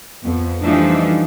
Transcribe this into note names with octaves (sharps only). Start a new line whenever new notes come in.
F2 B3
E3 F3 G3 A3 D4 D#4